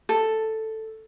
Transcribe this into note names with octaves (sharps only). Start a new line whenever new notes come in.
A4